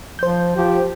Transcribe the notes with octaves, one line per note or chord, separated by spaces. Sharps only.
F3 C5 G6
F3 G4